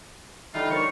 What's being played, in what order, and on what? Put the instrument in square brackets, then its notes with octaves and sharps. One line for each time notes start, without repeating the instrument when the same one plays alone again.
[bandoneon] D3 G3 D#4 [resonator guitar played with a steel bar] E3 [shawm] F4
[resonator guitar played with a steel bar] A#4 C5 C#5 [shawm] C#6